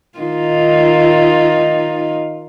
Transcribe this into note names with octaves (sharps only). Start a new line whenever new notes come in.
D#3 D#4 F4